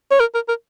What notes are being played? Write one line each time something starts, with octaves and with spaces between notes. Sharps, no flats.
C#5
A#4
A#4
A#4